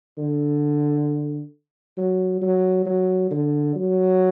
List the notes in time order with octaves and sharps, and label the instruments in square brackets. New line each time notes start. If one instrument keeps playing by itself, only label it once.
[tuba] D3
F#3
F#3
F#3
D3
F#3